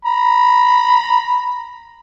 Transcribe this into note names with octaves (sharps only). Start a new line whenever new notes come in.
A#5 B5